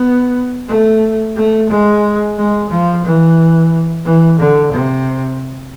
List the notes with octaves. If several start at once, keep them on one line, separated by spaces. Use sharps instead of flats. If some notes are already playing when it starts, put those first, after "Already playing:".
Already playing: B3
A3
A3
G#3
G#3
F3
E3
E3
D3
C3